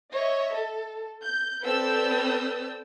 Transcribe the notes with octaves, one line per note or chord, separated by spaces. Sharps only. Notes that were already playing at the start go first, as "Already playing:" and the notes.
C#5 D#5 E5
A4
G6
C4 A4 B4 D5 E6 G6